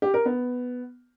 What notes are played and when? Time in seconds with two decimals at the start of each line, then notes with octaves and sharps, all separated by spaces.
0.02 G4
0.14 A#4
0.25 B3